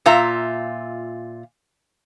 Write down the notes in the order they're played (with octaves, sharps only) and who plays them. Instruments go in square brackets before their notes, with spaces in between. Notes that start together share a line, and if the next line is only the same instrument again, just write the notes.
[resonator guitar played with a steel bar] A#2 F4 E5 A#5